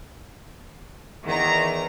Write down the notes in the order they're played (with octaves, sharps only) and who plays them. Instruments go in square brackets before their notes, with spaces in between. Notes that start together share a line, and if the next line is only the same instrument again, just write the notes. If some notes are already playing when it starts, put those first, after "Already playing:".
[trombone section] E2 [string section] D#3 A#5